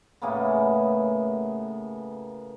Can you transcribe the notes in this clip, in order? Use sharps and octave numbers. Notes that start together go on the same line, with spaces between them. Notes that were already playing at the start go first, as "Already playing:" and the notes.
A2 C#3 A#3 B3